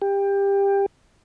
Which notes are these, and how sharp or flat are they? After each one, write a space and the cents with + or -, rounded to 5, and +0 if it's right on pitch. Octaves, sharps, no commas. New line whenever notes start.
G4 +20